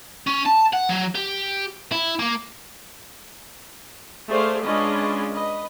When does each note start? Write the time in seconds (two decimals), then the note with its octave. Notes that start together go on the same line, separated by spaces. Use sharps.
0.27 C#4
0.45 A5
0.73 F#5
0.89 F#3
1.15 G4
1.92 E4
2.19 A#3
4.28 A3 G#4 C5 D5 F5
4.62 G#3 C#4 D4 F4 B4 D#5
5.32 B4 D#5